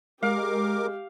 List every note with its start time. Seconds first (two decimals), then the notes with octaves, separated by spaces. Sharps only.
0.23 G#3 G4 A#4 F5 D6